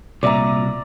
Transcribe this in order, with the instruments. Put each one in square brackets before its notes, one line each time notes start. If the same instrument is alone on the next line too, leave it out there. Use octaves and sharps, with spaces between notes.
[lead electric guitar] C2 A#2 [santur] D5 E5 A#5